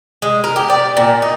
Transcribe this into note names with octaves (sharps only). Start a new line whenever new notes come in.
G#3
A#4
G4
D5
A#2
D#4